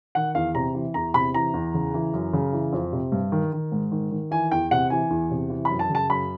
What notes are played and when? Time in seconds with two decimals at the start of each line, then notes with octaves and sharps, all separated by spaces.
0.15 D#3 F#5
0.35 E2 F5
0.55 C3 A#5
0.75 E3
0.94 E2 A#5
1.14 C3 B5
1.34 E3 A#5
1.54 E2
1.74 C#3
1.94 E3
2.13 F#2
2.33 C#3
2.53 E3
2.73 F2
2.92 C3
3.12 G2
3.32 D#3
3.53 D#3
3.72 G#2
3.91 D#3
4.11 D#3
4.31 E3 G#5
4.52 E2 G5
4.71 C3 F#5
4.90 E3 G#5
5.10 E2
5.30 C3
5.50 E3
5.65 F#2 B5
5.79 A5
5.90 C#3 A5
6.09 F#2 B5